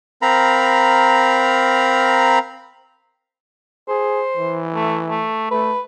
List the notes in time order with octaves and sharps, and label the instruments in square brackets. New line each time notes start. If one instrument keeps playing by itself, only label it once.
[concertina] C4 A#4 F5 A#5 B5
[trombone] G#4 [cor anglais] C5
[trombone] E3
[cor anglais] A3
A3
[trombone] A3 [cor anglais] B4